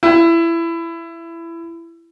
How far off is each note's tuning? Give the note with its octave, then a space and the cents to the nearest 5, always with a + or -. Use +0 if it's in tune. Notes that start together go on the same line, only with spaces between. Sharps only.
E4 +20